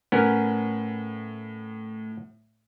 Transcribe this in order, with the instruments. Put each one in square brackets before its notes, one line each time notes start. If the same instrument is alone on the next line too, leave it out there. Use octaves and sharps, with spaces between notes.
[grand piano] A2 [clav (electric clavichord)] B3 C#4 A#4